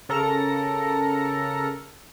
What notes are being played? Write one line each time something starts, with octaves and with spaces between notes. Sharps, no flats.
C#3 A4 A#4 A#5 A#6 C#7